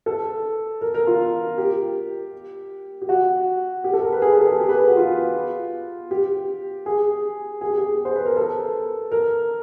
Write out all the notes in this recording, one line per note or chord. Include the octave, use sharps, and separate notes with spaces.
A4
A#4
A#4
F4
G4
G4
F#4
G4
A4
A#4
B4
G#4
B4
A4
G#4
G4
B4
G#4
F#4
F4
G4
G#4
G#4
G4
G#4
C5
B4
A#4
A4
A#4